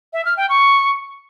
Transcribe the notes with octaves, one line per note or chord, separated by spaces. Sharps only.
E5
F6
G5
C#6